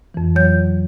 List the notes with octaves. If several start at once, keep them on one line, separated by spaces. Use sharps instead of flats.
F2 E3
F2 F#3 C#5 G6